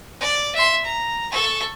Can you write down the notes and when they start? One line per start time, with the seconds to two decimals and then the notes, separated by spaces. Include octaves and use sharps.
0.21 D5
0.55 E5 C6
0.84 A#5
1.32 A4 C#6